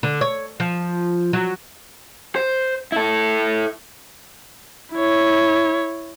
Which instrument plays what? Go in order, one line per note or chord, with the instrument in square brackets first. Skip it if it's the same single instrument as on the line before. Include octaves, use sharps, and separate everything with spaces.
[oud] D3
C#5
F3
F#3
[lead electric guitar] C5
E4 A4
[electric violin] E4 C#5